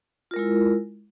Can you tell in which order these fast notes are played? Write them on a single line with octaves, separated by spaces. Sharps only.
F4 A#4 G#3 E4